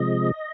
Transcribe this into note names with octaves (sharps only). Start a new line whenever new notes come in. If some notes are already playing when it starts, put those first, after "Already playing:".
Already playing: C3 F3 G#3 D#5